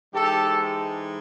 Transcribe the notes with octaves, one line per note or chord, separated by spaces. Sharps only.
G#2 E3 G#3 G4 A4